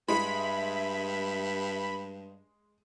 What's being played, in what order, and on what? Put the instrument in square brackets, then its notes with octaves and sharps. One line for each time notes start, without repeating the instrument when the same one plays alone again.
[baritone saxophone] G2 [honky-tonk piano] G#3 [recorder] E5 [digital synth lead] B5